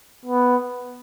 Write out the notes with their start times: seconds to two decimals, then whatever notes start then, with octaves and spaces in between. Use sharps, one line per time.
0.25 B3